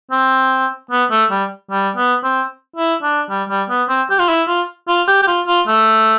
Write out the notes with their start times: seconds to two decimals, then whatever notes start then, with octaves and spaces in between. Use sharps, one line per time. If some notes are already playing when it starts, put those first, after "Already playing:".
0.11 C4
0.91 B3
1.11 A3
1.31 G3
1.71 G3
1.97 B3
2.23 C4
2.76 E4
3.03 D4
3.30 G3
3.49 G3
3.69 B3
3.89 C4
4.10 G4
4.19 F4
4.29 E4
4.48 F4
4.88 F4
5.08 G4
5.23 G4
5.27 F4
5.47 F4
5.67 A3